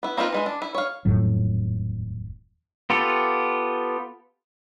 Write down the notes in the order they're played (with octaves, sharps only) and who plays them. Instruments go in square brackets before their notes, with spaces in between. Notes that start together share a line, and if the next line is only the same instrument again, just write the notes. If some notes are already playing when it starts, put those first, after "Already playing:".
[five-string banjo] B3 E4
A#3 C4 D#4 F4 B4
E3 G#3 E4
D4
E4
C#5 F5
[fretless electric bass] D#1 F2 A2 F#3
[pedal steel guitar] B3 F4 G4 A4